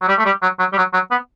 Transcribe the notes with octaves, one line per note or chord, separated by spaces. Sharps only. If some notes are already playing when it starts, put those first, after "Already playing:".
F#3
G3
A3
G3
F#3
F#3
G3
F#3
F#3
B3